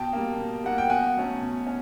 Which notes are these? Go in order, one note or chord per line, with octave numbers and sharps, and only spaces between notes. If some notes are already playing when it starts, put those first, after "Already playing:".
Already playing: B2 G5 A5
G3 A#3
B2
G3 A#3 F#5
G5
B2 F#5 G#5
F#3 A3 C#4
B2
C#4